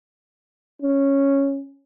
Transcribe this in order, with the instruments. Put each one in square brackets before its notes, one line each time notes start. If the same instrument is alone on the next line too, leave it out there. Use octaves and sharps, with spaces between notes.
[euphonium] C#4